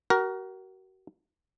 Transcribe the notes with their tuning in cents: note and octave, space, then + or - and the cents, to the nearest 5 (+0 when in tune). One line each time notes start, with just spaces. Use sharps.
F#4 +35 A#4 +10